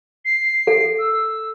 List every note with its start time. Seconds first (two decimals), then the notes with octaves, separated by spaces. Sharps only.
0.25 C7
0.67 A4
0.99 E6